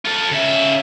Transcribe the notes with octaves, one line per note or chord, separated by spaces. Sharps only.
F4 A4
C#3 E5